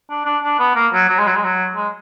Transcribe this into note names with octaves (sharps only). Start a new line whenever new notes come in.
D4
D4
D4
B3
A#3
F#3
F#3
G#3
F#3
G#3
F#3
G#3